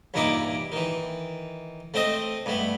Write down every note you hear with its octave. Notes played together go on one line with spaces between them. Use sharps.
E2 G2 A#2 D#4 E4 D6
D#3 E3
A3 C4 C5 D#5
G2 A3 B3